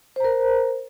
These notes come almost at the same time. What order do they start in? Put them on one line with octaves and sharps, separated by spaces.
C5 A#5 A#4